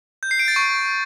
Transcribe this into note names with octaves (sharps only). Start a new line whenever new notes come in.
G6
C7
D7
A6
C#6